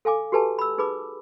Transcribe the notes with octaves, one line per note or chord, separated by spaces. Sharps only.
A4 F5 G#5 D6
F#4 G4 A4 B4 G#5 A5
B5 E6
D#4 G#4 B4 B5 D6